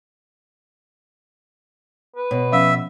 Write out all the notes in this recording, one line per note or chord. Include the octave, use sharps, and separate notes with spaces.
B4
B2 C#5
F3 C#4 E5 F5